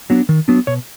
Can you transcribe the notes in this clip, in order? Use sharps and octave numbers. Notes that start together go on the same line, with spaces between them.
F#3 B3 D4
D#3
F#3 B3 D4
B2 C#5